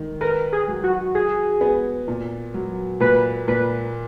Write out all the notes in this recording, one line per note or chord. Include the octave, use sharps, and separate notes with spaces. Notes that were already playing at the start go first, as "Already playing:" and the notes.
Already playing: D#3
A#4 B4
G#4
F#3
F#4
F#4 G#4
B3
A#2
F#3
A#2 B4
A#2 B4